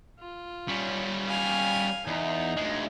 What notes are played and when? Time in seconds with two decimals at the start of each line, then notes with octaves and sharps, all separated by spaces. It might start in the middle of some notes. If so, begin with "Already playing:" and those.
0.20 F4
0.68 G3 C#4
1.29 F5 G#5
2.07 E2 D#4
2.57 D2 G#3